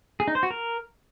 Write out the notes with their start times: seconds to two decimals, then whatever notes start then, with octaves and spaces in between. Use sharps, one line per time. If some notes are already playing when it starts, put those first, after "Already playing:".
0.20 G#4
0.28 D#4
0.35 C5
0.43 F#4
0.51 A#4